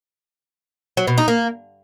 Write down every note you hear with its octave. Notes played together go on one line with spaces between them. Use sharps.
F#3
B2
D#4
A#3